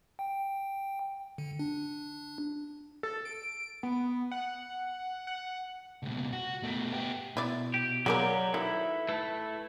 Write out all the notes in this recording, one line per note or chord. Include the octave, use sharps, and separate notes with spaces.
G5
D3
D4
A4
D7
B3
F#5
F#5
C#2 B2
F#4
B2 A3
B3 G4
B2 E4 D5
G4
F#3 G#3 A#3 A#4 D5
D#3 E4 A4 B4
A3 B4 A5